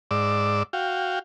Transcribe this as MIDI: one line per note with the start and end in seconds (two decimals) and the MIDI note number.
0.11 0.63 44
0.11 0.63 74
0.11 0.63 86
0.11 0.63 88
0.73 1.19 66
0.73 1.19 77
0.73 1.19 79